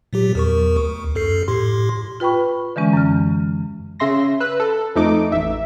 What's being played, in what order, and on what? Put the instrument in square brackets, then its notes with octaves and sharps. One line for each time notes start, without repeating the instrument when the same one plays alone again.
[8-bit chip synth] A#2 F#3 G4
E2 A#4 C#6
D2
F#2 A4 C7
A2 G4 C6
[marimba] F4 B4 G5 B5 C#6
D3 E3 G#3 C#4
F#2 F6
[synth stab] C#3 E5 C6 A#6
B4 E6 F#6
A4
F2 A3 D#4 D6
A1 E5